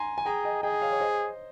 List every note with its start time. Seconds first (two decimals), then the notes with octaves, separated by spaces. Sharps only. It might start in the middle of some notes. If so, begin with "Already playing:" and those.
Already playing: G#5 A#5 C6
0.18 G#5
0.26 G#4 G5 A#5
0.44 D#5 G5
0.63 G#4 D#5 G5
0.82 C#5 F5
0.92 C#5
1.01 C5 D#5